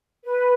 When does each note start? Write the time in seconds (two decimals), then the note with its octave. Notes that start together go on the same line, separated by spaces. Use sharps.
0.24 B4